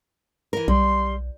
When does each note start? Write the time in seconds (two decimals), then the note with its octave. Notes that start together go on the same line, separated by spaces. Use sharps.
0.53 E3 A#4
0.68 B1 G3 C6